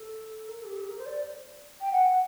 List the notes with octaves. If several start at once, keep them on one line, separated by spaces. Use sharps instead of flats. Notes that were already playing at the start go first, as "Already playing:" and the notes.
Already playing: A4
A#4
A4
G4
A4
G4
A#4
C5
D5
G5
F#5